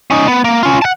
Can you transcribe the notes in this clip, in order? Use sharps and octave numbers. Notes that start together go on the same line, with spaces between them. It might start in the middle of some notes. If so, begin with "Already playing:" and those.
C#4 D#4
B3
A#3
C#4 F4
F#5 A5